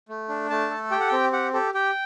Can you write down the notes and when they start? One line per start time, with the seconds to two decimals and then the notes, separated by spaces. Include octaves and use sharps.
0.09 A3
0.29 D4
0.50 A3 A5
0.71 A4
0.91 G4 G5
1.00 F#5
1.09 C4 G5
1.32 G4 F#5
1.53 G4 A4
1.74 G4 G5